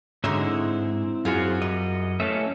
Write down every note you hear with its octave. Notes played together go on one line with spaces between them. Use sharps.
G#2 D3 G#3 C#4 D#4 F#4 E5
C4 E4
F#2 F4 F#4 G#4 C5
G3 D#5
A3 C#4 E5 F5 A5